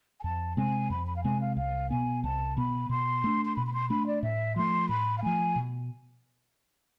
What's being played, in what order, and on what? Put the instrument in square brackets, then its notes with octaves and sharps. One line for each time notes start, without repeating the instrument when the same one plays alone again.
[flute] G#5
[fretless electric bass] F2 [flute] A5
[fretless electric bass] C3 G#3 C4 [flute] G#5
[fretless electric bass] F2 [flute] B5
[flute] B5
F5
[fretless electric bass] C3 G#3 C4 [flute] G#5
[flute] F5
[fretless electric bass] C2 [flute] F5
[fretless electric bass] B2 B3 [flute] G#5
[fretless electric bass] C2 [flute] A5
[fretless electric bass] B2 B3 [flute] B5
[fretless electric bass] B2 [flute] C6
[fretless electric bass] A3 D4
[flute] C6
[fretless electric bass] B2 [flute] B5
[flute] B5
C6
[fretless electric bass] A3 D4 [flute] B5
[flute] D5
[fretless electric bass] A2 [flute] E5
[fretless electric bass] F3 A3 [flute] C6
[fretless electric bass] A2 [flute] B5
[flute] F5
[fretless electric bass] F3 A3 [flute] G#5
[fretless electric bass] B2